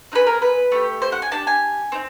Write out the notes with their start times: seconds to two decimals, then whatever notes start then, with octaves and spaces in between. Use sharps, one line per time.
0.12 C4 D#4 G#4 B4
0.27 A#4
0.42 B4
0.72 A3 D4 G4
1.02 C5
1.12 F#5
1.22 G#5
1.32 D4 G4 A5
1.47 G#5
1.92 C4 D#4